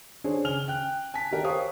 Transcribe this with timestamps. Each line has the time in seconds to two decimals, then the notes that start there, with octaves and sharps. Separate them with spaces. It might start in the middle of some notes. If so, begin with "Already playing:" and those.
0.24 D4 G#4 C5 C#5
0.44 C#3 G#5 F6 F7 G7
0.68 G5 F#6
1.14 G#5 A5 B6
1.31 G4 A#4 G5
1.44 C5 C#5 F5 C#6 D#6